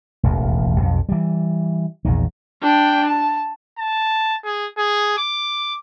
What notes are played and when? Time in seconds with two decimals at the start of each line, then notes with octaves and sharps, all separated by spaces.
0.23 E1 A1 D#2
0.80 B1 F2
1.09 E3 G3
2.05 A#1 E2 D#3
2.62 D4 G5
3.08 A5
3.78 A5
4.44 G#4
4.78 G#4
5.17 D6